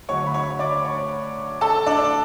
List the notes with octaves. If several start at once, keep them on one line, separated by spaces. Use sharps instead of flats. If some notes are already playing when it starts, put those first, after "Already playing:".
D2 D3 F#3 C#5 C#6
B5
C#5 C#6
D5 D6
C#5 C#6
A4 A5
D4 D5